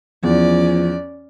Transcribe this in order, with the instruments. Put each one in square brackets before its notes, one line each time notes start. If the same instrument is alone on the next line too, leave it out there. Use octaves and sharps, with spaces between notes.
[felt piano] E2 [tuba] F3 [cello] C#4 D5